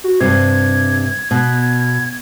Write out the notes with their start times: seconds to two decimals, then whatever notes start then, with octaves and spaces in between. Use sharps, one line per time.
0.04 F#4
0.21 G2 C3 G#6
1.31 B2